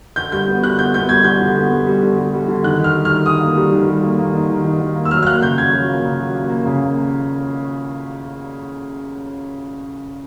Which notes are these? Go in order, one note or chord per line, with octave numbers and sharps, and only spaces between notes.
D3 G6
G3 G6
B3
D3 F#6
B3 G6
B3 G6
G3 G#6
D3 G6
D3
B3
G3
G3
D3
G3
G3
D3
D#3 F#6
D#3 F6
G3
F6
D#3
D#3 D#6
A#3
G3
D#3
G3
A#3
A#3
D#3
D#3
D#3
D#3
A#3
E6
F#3 F6
F6
A#3 F#6
C#3 G6
F#3 G#6
F#3
A#3
C#3
F#3
A#3
A#3
C#3
A#3